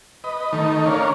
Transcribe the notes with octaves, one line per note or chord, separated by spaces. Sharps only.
B4 D#5
D#3 A3 D#4
C#4 D4 A#4 C#5 F5